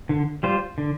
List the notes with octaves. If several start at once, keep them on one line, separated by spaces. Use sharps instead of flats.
D3
G3 F4 C5
D3